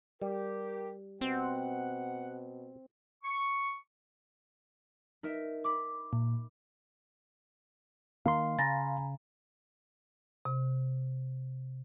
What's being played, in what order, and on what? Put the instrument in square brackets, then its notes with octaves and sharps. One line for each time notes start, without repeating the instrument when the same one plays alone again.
[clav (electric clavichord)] G3 [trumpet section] G4 [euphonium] A#4
[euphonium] B2 [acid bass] C4 [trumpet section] F#5
[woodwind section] C#6
[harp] D#4 A#4 E5
B5 D6
[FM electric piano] A#2
[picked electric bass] D#3 A#3 [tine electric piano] F5 C6
[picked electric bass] C#3 [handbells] G#5 A#5 B5 [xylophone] A6 A#6
[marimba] C3